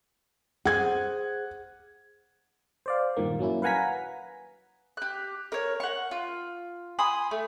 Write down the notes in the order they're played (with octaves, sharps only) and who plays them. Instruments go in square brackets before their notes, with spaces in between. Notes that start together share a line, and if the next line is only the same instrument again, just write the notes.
[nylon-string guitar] G#4 C5 [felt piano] F#5 G#6
[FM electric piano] C5 D5 F5
G2 A#2 D#3 A#3
F#3 A#3 C#4 E4
B4 F5 F#5 G#5 A#5 B6
[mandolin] G4 F#6
A#4 C#5
F#5 C#6
F4
G#5 B5 C6 D#6
A3